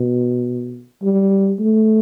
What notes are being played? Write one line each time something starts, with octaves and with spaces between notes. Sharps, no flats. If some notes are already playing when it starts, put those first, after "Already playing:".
Already playing: B2
G3
A3